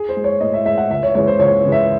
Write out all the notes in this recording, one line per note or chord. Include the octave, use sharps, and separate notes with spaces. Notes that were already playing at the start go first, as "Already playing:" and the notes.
Already playing: G#4
C5
G#3
C#5
A2 D#5
E5
G#3 E5
F#5
C#2 E5
C#5
C#3 E3 G#3 C#5
C5
C#2 C#5
C#3 E3 G#3
E5